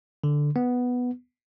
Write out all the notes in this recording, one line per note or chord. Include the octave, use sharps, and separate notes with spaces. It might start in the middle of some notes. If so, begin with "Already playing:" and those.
D3
B3